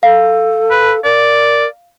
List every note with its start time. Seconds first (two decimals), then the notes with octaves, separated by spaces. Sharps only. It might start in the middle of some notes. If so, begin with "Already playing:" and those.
0.03 A4 F5
0.71 B4
1.04 A#4 D5